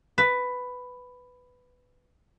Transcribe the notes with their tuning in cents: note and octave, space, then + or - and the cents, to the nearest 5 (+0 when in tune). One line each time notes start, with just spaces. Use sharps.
B4 +10